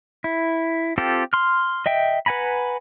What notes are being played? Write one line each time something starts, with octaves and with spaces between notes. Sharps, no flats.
E4
C4 F4 G4 A4
C6 F6
D#5 E5 G5
B4 F#5 G#5 A#5 B5